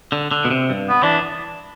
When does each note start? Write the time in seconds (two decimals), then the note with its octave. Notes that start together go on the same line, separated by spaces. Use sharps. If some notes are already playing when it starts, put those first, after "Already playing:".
0.12 D3
0.31 D3
0.45 B2
0.51 C3
0.70 G2
0.89 B3
1.03 E3 D4